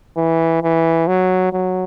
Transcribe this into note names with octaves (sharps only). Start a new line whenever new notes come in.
E3
E3
F#3
F#3